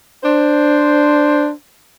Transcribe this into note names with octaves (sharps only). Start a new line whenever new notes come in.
D4 C5